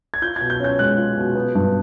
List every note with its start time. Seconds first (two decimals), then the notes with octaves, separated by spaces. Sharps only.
0.14 G#6
0.22 F4 G6
0.36 B2 G#6
0.50 G6
0.60 C#4 G6
0.79 G#3 F#6
0.97 F4
1.17 B2
1.35 B3
1.55 G2